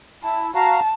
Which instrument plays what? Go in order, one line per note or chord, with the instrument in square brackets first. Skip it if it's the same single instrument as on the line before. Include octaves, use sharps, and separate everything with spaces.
[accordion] E4 [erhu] A5
[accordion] F#4 F5 A#5 [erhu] A5